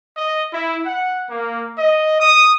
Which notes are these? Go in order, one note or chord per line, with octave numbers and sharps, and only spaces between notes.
D#5
E4
F#5
A#3
D#5
D#6